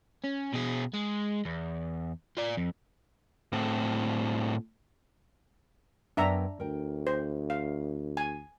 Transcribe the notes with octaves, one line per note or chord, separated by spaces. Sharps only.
C#4
B2 G#4
G#3
E2
F4 D5
F2
A2 C4
F#2 B3 D4 E5 G5 A#5
D2 A#4 G5
C5
F5
G#5